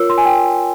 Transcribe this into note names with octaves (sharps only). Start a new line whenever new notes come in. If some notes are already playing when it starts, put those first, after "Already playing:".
Already playing: F4 A#4 C#5 E6
C6
G#5
G5